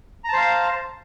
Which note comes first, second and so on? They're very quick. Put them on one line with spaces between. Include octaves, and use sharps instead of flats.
A#5 A5 C5 F5